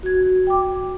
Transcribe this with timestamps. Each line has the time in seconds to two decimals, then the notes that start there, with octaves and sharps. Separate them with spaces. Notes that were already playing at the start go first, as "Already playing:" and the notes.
0.03 F#4 G#6
0.47 G5 D6